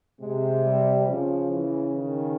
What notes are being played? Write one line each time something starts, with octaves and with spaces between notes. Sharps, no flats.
C3 G#3
G3
C#3 F3
E3
D#3